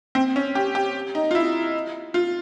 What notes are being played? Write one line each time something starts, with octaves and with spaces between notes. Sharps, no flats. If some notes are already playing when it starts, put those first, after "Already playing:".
C4
C#4
G4
G4
D#4
F4
E4
F4